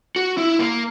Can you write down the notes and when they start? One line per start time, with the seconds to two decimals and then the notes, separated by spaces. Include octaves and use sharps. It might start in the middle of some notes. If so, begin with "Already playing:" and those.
0.16 F#4
0.38 E4
0.59 A#3